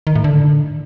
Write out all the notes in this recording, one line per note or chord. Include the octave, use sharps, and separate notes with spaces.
D#3
A2
D3